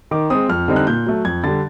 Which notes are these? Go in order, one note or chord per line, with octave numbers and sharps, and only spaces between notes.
D#3 D6
G#3 C4 D#6
F2 F6
D3 G3 C4 D#4
F#6
A#2 G6
F#3 A3
F2 G#6
D3 G3 A6